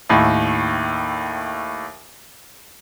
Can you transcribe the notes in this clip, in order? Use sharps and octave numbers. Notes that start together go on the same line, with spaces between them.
D#2 A2